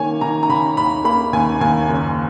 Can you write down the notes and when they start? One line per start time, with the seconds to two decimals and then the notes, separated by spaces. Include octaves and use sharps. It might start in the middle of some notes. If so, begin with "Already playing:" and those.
Already playing: D#3 A#3 C#5 G#5
0.21 D#3 A#5
0.43 A#5
0.49 D#3 B5
0.77 D#2 B5
1.05 A#3 B5
1.33 D#2 G#5
1.61 D#2 G#5
1.89 F#1